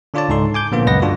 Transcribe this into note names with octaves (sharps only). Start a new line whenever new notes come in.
D3 D4 F4 C#5 D5 A5
C#2 G#2 D#4 A4 C6
G#5 D6 G6
A#2 D3 F3 A#3 B3 F4
C#2 F#2 B4 D#5 F#5 A#6
G2 D3 D4 F4 F#4